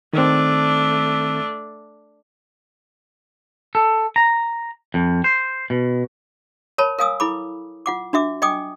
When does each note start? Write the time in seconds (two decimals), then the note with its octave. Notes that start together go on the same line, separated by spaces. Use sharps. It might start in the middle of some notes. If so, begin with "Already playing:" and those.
0.13 D#3 A3 C4 D4
3.75 A4
4.16 A#5
4.94 F2
5.24 C5
5.70 B2
6.78 A#4 C#5 A5 B5
6.99 A#4 F5 G#5 D#6 E6
7.20 E4 A4 B5 D6
7.86 F4 F#5 D6
8.13 D4 F#4 E5 D6
8.42 D#5 G5 G#5 D6 D#6